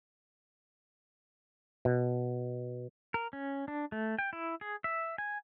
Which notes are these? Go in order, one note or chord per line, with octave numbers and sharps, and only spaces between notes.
B2
A#4
C#4
D4
A3
G5
E4
G#4
E5
G#5